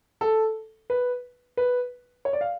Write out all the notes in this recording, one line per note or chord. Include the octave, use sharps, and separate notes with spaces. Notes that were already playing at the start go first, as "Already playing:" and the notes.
A4
B4
B4
C#5
D5
F5